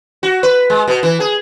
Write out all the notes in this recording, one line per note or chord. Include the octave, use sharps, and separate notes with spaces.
F#4
B4
G#3
B2
E3
G#4